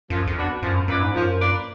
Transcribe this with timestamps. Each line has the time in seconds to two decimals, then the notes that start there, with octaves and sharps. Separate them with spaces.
0.10 F#2 F3
0.27 F2
0.36 B3 D4 F#4 B4
0.62 F#2 F3
0.88 F#2 A#3 F4 B4 D5
1.02 G#2
1.14 F#2 F3
1.40 A#3 F4 B4 D5